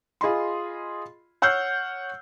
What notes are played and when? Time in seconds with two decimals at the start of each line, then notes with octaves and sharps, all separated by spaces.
0.21 F4 G#4 D#5 B5 C6
1.42 C#5 F#5 E6 F6 G6 C7